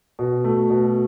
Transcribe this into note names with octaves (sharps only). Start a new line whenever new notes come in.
B2
A3
B2